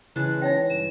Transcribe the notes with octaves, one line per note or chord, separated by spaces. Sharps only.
C#3 E3 G#3 A5 F#6
D#4 C#5 G5 A#6
G2 E7